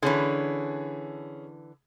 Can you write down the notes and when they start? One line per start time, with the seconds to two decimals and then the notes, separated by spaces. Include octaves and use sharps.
0.03 D3 E3 C#4 G#4